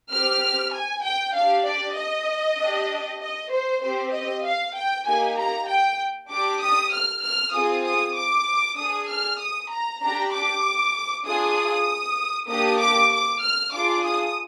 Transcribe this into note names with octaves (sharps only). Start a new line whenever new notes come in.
C4 G4 F6
G#5
G5
D4 G4 F5
D5
D#5
D4 G4
D#5
C5
C4 G4 C5
D#5
F5
G5
A#3 D#4 G4 G#5
A#5
G5
D4 G4 D6
D#6
F6
F6
C4 F4 G#4 D#6
D#6
D6
D4 G#4 D#6
F6
D#6
A#5
D4 G4 A#5
D6
D4 F4 G#4 D#6
A#3 D4 G4 D#6
D6
D6
F6
D4 F4 G#4 D6
D#6